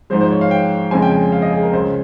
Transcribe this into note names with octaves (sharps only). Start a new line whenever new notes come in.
G#2 F3 G#3 C5
C5
C#5
F5
G5
F2 C#3 F3 G#3 G#5
G5
G#5
F5
D#5
G#4
A#4
C#2 C#3 G#3 C5